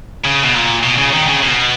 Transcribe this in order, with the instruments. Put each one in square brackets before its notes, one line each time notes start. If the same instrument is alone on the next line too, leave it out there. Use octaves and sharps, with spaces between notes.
[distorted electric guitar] C#3
B2
A#2
B2
C#3
D#3
C#3
B2